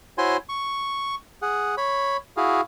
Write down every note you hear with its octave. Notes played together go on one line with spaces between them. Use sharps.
E4 F#4 C5 C#5 G#5 C6
C#6
G#4 F#5
C#5 B5
E4 F#4 G#4 F5